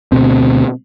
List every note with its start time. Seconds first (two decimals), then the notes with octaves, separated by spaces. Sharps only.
0.12 D2 B2 C4